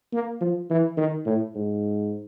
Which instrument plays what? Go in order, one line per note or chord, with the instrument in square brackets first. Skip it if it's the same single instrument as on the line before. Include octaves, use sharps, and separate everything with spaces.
[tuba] A#3
F3
E3
D#3
A2
G#2